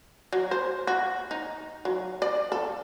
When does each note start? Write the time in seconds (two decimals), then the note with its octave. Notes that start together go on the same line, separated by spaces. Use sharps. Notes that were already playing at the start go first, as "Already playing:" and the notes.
0.33 F#3
0.51 C5
0.87 F#4
1.31 D#4
1.85 F#3
2.22 D5
2.52 A4